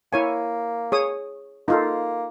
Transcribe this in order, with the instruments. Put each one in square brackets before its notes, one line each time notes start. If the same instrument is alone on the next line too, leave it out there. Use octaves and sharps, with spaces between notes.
[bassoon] A#3 [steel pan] E4 C#5 G#5
[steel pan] G#4 C#5 D#6
[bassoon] A#3 [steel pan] D#4 F4 A4